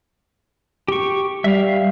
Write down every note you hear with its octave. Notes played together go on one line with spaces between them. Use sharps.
G4 C#6
G3 E5 F5